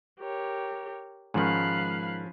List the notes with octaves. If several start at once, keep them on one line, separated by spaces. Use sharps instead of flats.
G4 A#4 C#5
G#2 D#3 F3 C#4 F5 B5 F#6